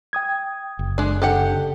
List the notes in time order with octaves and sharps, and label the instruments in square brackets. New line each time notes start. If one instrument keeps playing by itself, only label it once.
[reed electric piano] G5 D#6 G#6
[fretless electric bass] F#1
[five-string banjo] G#3 D4
[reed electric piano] C#3 A4 [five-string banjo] D4 G4 F#5